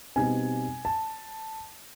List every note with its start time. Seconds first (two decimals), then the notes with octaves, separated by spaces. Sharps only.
0.16 B2 G3 C4 D#4 G#5
0.85 A5